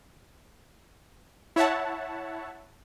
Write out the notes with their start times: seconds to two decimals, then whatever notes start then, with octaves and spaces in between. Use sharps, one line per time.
1.56 E4 C#5 E5 F#5 A5